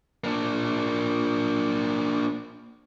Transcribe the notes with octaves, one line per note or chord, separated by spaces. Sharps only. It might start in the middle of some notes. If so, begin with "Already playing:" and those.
A#3 D4